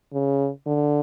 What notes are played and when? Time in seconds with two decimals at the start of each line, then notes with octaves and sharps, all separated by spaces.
0.13 C#3
0.66 D3